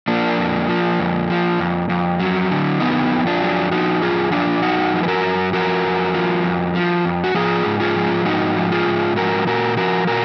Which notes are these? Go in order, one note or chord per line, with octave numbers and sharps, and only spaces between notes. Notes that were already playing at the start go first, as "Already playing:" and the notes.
F3 A#3 D4
F2
F3
F2
F3
F2
F2
F#3
D3
F2 B3 D#4
F2
D4 F4
F#3
F3 D#4 F#4
F#2 F4 G#4
F3 D4 F4
F#2 D#4 F#4
F3
B4
F#4 A#4
F#2
F3 F#4 A#4
F2
F3
F2
F3
F2
F#4
F3 F4 G#4
G#2
F4 G#4
F3
G#2 D#4 F#4
F3
F4 G#4
G#2
F3 F#4 A#4
A#2 F#4 A#4
F3 F#4 A#4
A#2 F#4 A#4